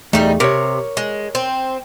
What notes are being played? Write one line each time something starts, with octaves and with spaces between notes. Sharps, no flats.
E2 G3 A3 D#4
C3 A#4 C#5
G#3
C4